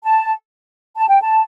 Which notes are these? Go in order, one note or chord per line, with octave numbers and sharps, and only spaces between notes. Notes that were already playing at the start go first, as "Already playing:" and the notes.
A5
A5
G5
A5